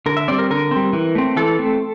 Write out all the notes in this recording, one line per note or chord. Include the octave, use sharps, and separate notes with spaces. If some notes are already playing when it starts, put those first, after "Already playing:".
D3 A#4
E5
G3 C4 D5
A#4
D3 A#4
G3 C4
E3
A3 C4
E3 A4
A3 C4